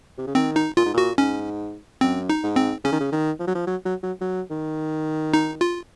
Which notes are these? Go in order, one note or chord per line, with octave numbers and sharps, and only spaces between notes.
C3
C#3
D#3 C4
D#4
A#2 F4
G#2
A#2 F#4
G#2 C#4
F#2 C4
D#4
G#2
C4
C#3 C#4
D#3
C#3
D#3
F3
F#3
F3
F#3
F#3
F#3
F#3
D#3
D#4
F4